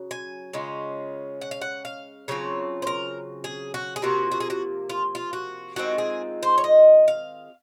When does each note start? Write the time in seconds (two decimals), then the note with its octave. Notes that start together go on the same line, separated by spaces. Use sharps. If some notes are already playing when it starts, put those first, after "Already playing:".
Already playing: C#3 F#3
0.11 G#5
0.53 C#3 G#3 C#4 F4
1.41 F#5
1.51 F5
1.61 F#5
1.85 F5
2.28 C#3 F#3 C4 F4 C#5
2.82 C5
2.87 A#4
3.44 G#4
3.74 F#4
3.96 G#4
4.02 C3 F3 A#3 F4 F#4
4.32 F#4
4.40 G#4
4.50 F#4
4.90 F4
5.15 F4
5.33 F#4
5.76 D#3 G#3 C4 F4 F#4
5.98 G#4
6.43 C5
6.58 C#5
6.64 D#5
7.08 F5